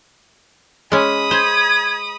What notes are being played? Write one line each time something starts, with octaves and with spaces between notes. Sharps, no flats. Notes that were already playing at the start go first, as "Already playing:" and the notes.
G#3 C#4 B5 D#6
C5 G#6